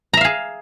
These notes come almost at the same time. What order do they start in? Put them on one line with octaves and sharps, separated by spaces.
A#5 E5 F5 G#4